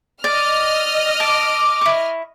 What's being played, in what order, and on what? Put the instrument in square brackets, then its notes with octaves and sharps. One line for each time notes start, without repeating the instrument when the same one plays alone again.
[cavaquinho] D5 [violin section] D#5 F6
[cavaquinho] A5 [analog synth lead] D6
[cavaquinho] E4 C#6